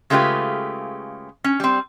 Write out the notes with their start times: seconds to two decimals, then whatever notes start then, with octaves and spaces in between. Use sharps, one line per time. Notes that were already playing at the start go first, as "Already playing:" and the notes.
0.10 C#3 G#3 A3 F4 G4 B4
1.44 C#4
1.60 G3 C4